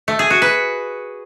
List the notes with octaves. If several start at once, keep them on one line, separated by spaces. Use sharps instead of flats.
A3
G#4
F#4
B4